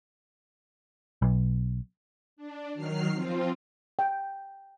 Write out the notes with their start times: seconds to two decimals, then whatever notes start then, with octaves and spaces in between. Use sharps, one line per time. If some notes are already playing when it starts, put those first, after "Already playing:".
1.22 B1
2.36 D4
2.74 D#3 F#3 F6 C7
3.13 F3 C4 F4
3.99 G5